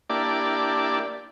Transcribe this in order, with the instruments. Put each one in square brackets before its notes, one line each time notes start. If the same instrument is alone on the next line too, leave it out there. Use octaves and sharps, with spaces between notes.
[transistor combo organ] A#3 D4 E4 G4 D5 A5